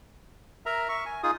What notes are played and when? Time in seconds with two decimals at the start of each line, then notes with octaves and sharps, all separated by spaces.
0.66 A#4 E5 A#5
0.89 E5 C#6
1.06 G#5
1.23 D#4 F4 G#4 D#6